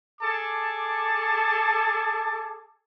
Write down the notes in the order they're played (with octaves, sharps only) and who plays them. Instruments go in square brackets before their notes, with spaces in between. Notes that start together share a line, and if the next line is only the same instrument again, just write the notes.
[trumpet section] G#4 A4 A5 D6